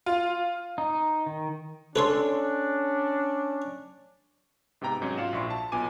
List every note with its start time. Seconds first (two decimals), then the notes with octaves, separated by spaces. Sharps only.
0.06 F4
0.78 D#4
1.26 D#3
1.96 C#4 D4 A4 B4 C#5 C6
4.81 G#2 C3 B3 G5 A#5
5.02 G#2 F#3 C#4 D#4
5.18 F4 F#4 D5 F5 F#5 E7
5.33 A#1 A#2 E4 C6 C#6
5.50 A5
5.72 B1 B3 F4 G#5 D6 D#7